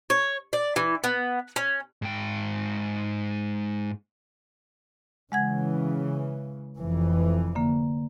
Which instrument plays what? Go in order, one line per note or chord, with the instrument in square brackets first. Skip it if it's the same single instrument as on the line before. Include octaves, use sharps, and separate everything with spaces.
[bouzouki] C#5
D5
E3
B3
C#4
[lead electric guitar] G#2 G5
[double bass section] C#3 E3 [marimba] G#3 F#5 G#6
[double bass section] F1 F2 E3
[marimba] D3 A#3